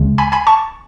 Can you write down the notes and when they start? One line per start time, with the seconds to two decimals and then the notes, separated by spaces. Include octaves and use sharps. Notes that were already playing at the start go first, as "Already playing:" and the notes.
Already playing: D2 C#3 G#3
0.18 G#5 B5
0.32 G#5 B5
0.47 A5 C#6